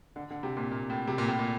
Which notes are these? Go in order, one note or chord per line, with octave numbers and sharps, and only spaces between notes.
D3
D3
C3
A#2
A#2
A2
C3
A#2
A2
A#2